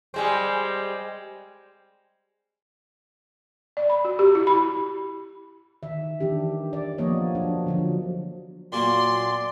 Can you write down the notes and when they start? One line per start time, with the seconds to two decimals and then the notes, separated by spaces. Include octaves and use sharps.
0.14 G3 G#3 C4
3.77 D5
3.90 B5
4.05 F#4
4.19 G4
4.35 E4
4.47 B5
5.83 D#3 E5
6.20 D#3 E3 D4 G4
6.73 D5
6.98 F3 A#3 B3 C#5 D#5
7.35 F#3 D4
7.66 D3 F3 F#3
8.72 A#2 F#3 A#3 D5 C6